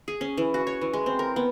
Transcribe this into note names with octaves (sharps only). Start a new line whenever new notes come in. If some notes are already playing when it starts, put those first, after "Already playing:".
G#4
C#4
E3
F#4
C#5
E3
G#3
C4
A#4
B3